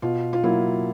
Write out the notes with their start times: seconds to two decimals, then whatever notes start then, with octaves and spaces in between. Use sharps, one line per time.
0.02 B2 F4
0.33 F4
0.43 F#3 A#3 E4